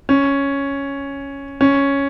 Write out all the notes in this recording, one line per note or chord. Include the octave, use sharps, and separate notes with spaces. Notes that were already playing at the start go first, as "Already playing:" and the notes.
C#4
C#4